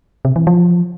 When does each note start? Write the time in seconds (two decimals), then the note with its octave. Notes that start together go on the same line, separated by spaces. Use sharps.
0.25 C3
0.36 E3
0.47 F3